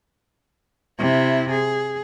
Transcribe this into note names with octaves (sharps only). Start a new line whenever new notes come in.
C3 E4
G#4